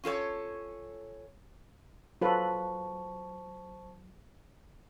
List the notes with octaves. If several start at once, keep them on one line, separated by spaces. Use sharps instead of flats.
C#4 F4 A4 C#5
F#3 F4 A4 B4 C5 A5 C#6